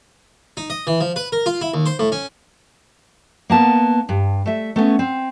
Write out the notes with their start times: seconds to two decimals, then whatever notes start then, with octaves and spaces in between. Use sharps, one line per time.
0.57 D#4
0.70 D#5
0.87 E3
1.01 F3
1.16 B4
1.32 A#4
1.46 F4
1.61 E4
1.74 D#2
1.86 C5
1.99 A2
2.12 C#4
3.50 A#3 B3 A5
4.09 G2
4.46 A3 E5
4.76 A3 B3 C#4
4.99 C4